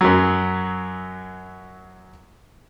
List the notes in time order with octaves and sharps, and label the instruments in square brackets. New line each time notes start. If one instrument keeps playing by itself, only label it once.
[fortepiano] F#2 F#3